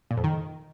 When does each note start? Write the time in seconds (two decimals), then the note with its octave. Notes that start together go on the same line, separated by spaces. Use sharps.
0.11 A#2
0.17 F2
0.24 D#3